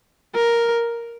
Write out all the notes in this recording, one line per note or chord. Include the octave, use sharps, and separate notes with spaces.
A#4